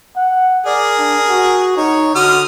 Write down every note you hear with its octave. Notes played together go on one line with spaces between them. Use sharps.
F#5
G#4 A#4 D5
D4
F#4
D#4 C#5
D3 F#4 D#6 F6